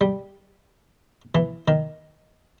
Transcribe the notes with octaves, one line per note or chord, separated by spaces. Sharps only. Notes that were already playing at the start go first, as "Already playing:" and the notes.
G3
E3
D#3